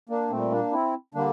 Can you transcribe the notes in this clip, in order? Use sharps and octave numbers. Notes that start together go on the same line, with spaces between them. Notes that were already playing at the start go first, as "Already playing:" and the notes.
A#3 D4
A#2 G3 A3 C4
A#3 D4
C4 E4
D3 G3 A#3 D4